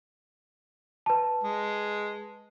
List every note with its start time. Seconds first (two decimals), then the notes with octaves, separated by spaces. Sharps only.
1.06 B4 A5
1.44 G#3